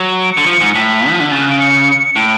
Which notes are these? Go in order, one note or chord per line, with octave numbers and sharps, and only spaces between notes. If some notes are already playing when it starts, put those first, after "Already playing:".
Already playing: F#3
D7
D3 C#7
F3
G#2
A2 B6
F3
D3
C#3 A6
F#6
D7
C#7
A2 D7